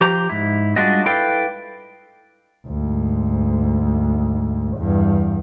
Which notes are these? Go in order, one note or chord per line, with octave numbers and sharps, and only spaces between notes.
F3 G4 C5 A#5
G#2 E4
G3 G#3 D4 F4 F#4 D#5
E4 A4 B4 D5 F5 G5
D2 G#2
E2 G2